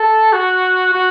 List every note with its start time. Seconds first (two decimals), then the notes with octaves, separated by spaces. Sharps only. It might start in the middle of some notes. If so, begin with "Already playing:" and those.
Already playing: A4
0.33 F#4
0.94 F#4